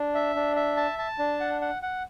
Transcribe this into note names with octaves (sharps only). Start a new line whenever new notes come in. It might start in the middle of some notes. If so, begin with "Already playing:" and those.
Already playing: D4
E5
D4
E5
A5
A5
D4
F#5
F#5
F#5